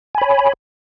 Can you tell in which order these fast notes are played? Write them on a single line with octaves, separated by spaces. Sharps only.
G#5 B5 C#5